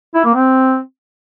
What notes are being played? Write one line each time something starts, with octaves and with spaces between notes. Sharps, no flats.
E4
A#3
C4